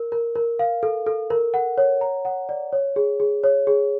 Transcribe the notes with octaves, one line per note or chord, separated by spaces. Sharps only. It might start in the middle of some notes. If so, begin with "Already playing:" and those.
Already playing: A#4
A#4
A#4
F5
A4
A4
A#4
F#5
C#5
A#5
F#5
D5
C#5
G#4
G#4
C#5
G#4